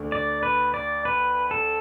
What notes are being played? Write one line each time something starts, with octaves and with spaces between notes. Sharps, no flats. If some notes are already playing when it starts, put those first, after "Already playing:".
Already playing: D2 D3 A3 D4
D5
B4
D5
B4
A4